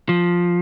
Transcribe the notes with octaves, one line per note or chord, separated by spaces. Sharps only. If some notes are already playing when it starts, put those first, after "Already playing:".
F3